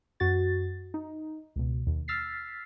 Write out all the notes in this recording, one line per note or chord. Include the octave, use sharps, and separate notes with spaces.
F#2 F#4 A6
D#4
C#2 B2
D#2
E6 F6 A6 B6 C7